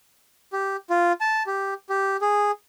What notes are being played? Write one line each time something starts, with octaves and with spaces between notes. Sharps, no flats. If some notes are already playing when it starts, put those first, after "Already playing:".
G4
F4
A5
G4
G4
G#4